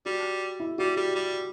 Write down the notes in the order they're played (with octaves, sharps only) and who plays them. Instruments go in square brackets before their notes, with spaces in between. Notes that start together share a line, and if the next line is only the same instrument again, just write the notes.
[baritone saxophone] G3 [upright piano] F#4
[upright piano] E4
[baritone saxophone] G3 [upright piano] F#4
[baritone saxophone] G3 [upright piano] G4
[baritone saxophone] G3